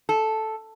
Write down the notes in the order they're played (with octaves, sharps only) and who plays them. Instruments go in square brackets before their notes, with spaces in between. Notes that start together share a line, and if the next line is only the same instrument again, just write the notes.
[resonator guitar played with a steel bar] A4